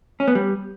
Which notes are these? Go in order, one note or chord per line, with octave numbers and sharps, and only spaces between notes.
C#4
B3
G3